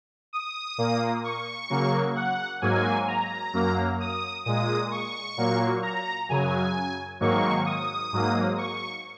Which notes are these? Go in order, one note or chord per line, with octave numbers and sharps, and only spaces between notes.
D#6
A#2 A#3
C#6
C#3 F#3 A#3
F#5
G#2 F#3 A#3 G#5
A#5
F#2 F#3 A#3
D#6
A#2 G#3 D#6
C#6
A#2 F#3 A#3
A#5
F#2 C#3 F#3 G#5
G#2 D#3 F#3 A#3 C#6
D#6
G#2 F#3 A#3
C#6